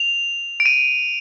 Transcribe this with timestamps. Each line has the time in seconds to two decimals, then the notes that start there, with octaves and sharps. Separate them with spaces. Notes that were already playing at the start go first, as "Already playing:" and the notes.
Already playing: F7
0.60 D7
0.66 D#7